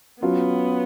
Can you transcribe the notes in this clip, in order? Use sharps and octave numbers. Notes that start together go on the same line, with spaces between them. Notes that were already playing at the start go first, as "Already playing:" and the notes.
F#3 B3 C#4 F4